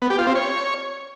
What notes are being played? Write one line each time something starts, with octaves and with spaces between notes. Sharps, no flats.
B3
G4
F4
C4
C#5